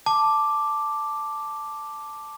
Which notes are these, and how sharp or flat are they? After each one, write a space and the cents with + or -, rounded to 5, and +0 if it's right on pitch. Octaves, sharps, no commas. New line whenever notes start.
A5 +0 D6 +0